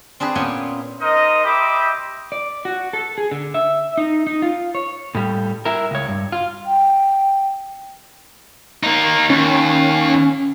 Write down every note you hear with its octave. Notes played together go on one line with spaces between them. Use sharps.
C4 D4 G#4 B4
A#2 B3 C#4 G5 G#5
D#4 A#4 C5 D#5
G4 C5 D#5 E5 B5 D6
D5
F#4
A4
G#4
D3
E5
D#4
D#4
F4
C#5
A2 G3
E4 A#4
C#2 C#5
G2
F4
G5
A#3 D#4
D#2 C#4